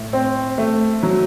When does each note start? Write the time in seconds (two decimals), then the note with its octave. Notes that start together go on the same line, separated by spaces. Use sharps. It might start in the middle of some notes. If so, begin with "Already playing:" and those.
Already playing: A2
0.13 C4
0.58 A3
1.03 F#3